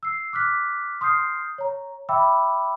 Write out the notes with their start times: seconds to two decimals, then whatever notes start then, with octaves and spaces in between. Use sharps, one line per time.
0.03 E6 C7
0.33 D6 F6 F#6 B6
1.01 C6 D#6 F6 G6 C7
1.58 C#5 A#5
2.09 E5 G5 B5 D6 E6